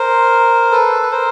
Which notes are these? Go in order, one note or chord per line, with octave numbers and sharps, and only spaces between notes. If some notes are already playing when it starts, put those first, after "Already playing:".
Already playing: A#4 C5
A4 B4
B4
A#4 C5